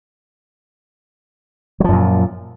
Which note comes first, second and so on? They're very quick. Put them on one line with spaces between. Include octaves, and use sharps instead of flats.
F#3 F3 F#2 A#2